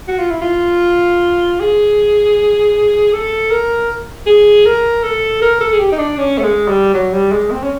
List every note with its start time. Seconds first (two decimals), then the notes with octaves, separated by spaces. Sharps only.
0.08 F#4
0.19 F4
0.30 E4
0.42 F4
1.60 G#4
3.13 A4
3.51 A#4
4.26 G#4
4.65 A#4
5.03 A4
5.42 A#4
5.60 A4
5.72 G#4
5.79 G4
5.92 D#4
5.98 D4
6.17 C#4
6.38 A3
6.43 G#3
6.68 G3
6.94 F#3
7.13 G3
7.32 G#3
7.51 C4
7.63 C#4